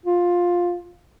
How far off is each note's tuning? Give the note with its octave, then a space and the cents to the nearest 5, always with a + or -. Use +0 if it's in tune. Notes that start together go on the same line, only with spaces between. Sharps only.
F4 +10